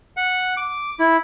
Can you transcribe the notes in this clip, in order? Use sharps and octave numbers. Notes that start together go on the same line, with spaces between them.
F#5
D6
E4